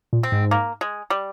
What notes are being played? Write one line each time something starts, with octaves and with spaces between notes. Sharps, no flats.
A#2
C4
G#2
A#3
G#3
G3